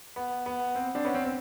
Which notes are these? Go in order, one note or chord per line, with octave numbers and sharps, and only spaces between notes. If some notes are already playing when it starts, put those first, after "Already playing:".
B3
B3
C4
C4 D4
B3 C#4
C4
C4